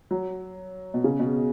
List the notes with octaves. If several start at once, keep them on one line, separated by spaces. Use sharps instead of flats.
F#3
B2
C#3
B2